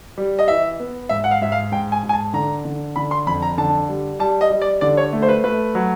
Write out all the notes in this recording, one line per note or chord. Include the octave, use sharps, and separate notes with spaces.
G3
D#5
E3 E5
B3
G#2 E5
F#5
F5
G#2 E5
F5
G#2 G5
G#5
G#2
G#5
A5
D3 A#5
D3
D3 B5
C6
F2 B5
A#5
D3 A5
G3
G3 A5
D#5
G3
D5
D3 D5
C#5
A3
C5
B4
A3 B4
F#3